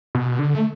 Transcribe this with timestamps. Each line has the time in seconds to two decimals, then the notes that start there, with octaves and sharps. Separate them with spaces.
0.15 B2
0.39 D3
0.55 A3